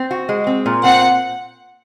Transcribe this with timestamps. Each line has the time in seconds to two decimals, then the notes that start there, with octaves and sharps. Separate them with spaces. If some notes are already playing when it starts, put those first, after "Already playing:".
Already playing: C4
0.11 F#4
0.29 G#3
0.47 C4
0.66 A#2
0.84 C4 F#5